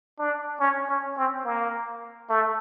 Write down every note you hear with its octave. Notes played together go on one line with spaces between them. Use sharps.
D4
C#4
C#4
C4
A#3
A3